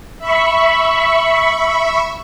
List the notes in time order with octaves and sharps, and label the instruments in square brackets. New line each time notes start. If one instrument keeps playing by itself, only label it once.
[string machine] E5 B5 C#6